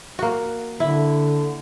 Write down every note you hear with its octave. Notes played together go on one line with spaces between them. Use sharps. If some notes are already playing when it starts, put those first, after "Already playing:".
A#3 F#4
D3 E4